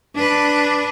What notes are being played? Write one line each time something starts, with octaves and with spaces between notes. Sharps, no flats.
D4 B4